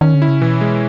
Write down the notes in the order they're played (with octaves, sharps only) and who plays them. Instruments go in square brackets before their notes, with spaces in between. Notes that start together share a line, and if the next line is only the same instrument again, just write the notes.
[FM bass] D#3 [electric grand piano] C#4
[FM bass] D3
[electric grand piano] E4
[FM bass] C#3
[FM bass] B2 [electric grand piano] E3
[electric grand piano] G#3